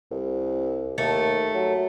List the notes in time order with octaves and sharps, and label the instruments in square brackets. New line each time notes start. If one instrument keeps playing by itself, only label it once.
[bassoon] C2
[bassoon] D#2 [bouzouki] A3
[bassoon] F#3